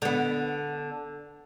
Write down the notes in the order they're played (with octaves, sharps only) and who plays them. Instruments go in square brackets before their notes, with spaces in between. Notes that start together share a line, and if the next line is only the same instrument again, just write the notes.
[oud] D3 B3